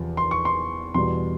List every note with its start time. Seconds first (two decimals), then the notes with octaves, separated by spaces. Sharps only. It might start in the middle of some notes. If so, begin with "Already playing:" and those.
Already playing: E2 C3 F3
0.17 C6
0.31 C#6
0.45 C6
0.94 E2 B2 G3 C6